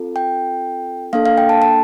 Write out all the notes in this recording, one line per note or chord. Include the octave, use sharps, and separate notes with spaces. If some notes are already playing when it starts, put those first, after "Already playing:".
Already playing: C4 F4 A4
G5
A#3 D4 A4 F5
F5
G5
A5
A5